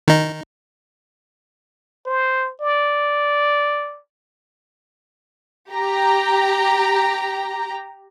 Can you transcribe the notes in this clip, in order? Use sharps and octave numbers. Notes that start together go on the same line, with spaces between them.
D#3 D#4
C5
D5
G4 A#5